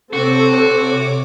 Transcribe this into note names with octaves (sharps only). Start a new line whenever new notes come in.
C3 C4 F#4 A4 C#5 D6